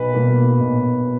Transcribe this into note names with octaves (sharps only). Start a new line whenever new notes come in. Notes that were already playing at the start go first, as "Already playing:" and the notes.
Already playing: B1 B4
B2 A#3
B1